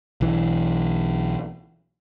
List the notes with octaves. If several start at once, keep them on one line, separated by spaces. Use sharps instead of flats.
B1 E3